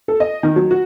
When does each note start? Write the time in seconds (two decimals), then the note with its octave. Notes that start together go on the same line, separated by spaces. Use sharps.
0.08 A4
0.20 D#5
0.43 D#3
0.56 F#3
0.71 F#4